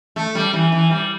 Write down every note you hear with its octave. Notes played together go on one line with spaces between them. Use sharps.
A3
G3
E3
E3
G3